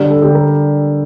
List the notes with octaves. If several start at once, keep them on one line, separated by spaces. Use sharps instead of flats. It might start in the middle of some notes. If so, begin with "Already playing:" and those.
Already playing: D3 G3 D4
A4
D3 G3 D4 G4
A#4